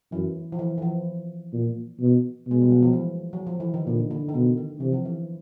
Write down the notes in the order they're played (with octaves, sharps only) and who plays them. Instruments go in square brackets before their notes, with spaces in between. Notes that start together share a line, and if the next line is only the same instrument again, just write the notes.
[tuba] F#2 [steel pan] E3
[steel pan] F3
E3
E3
F3
[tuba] A#2
B2
[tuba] B2 [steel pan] G#3
[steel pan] G3
F#3
F3
E3
F#3
F3
E3
D#3
[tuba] A#2 [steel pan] D3
[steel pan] D3
D#3
[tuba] B2 [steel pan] D3
[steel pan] D#3
[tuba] C3 [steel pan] E3
[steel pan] F3
E3